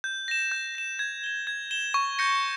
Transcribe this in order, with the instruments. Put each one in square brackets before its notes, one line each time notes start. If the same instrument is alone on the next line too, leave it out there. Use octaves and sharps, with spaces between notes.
[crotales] G6
A#6 E7
G6
A#6 E7
G#6
E7 G7
G#6
E7 G7
C#6
G6 A#6 C#7